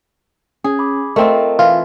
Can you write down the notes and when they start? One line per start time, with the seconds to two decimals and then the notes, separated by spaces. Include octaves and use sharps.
0.64 C#4 G#4
0.79 B5 D6
1.16 A3 C4 F4 A#4 D#5
1.59 E3 F4